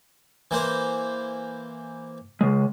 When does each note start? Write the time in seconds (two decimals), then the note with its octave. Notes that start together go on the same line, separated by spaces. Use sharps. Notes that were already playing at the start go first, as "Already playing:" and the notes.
0.51 E3 A#3 C5
2.41 C#3 G#3